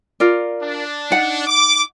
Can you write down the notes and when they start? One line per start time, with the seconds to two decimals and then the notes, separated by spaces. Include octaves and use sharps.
0.20 F4 A#4 D5
0.61 D4
1.11 D#4 F#5
1.47 D6